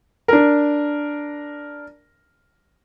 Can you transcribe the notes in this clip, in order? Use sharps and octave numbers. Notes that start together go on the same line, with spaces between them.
D4 A#4